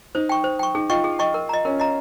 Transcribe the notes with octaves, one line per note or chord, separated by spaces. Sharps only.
D#4 C5
G5 C#6
C5
G5 C#6
D#4 G#4
F4 D#5 G5 C#6
G#4
D#5 G5 C#6
A#4
D#5 A#5
C#4 A#4
D#5 A#5